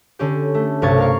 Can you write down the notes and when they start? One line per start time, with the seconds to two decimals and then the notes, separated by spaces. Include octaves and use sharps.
0.19 D3 C#4 G4
0.54 A3
0.82 B1 G2 C3 C#6 G#6 A6
0.98 A#4 D5 F5 C#6